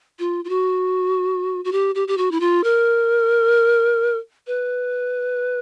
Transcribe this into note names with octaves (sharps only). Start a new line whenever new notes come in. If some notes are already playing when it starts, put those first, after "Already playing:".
F4
F4
F#4
F#4
G4
G4
G4
F#4
E4
F4
A#4
B4